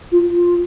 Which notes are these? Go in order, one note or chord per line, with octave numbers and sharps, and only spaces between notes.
F4
F4